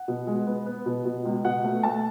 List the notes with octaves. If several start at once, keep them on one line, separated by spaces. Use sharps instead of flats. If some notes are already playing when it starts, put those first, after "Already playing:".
Already playing: F#5
B2
G#3
B3
B3
B2
B2
C#2
B2 F#5
A3
A3 A5